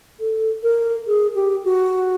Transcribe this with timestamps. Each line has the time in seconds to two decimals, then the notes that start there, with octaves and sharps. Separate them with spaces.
0.20 A4
0.63 A#4
1.07 G#4
1.35 G4
1.64 F#4